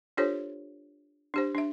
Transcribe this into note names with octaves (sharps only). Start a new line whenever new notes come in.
D4 F4 G4 A4 C5 C#5
D4 G4 C5
D4 E5